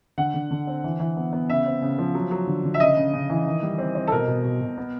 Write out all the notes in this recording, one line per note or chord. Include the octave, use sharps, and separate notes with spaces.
D3 F#5
D3
D3
C4
E3
E3
B3
B3
C#3 E5
C4
C#3
F3
F#3
F#3
D3
D3
E5
C#3 D#5
C#3
C#3
E3
D#3
G3
C4
C4
A4
B2 A#4
B2
B2
B2
B3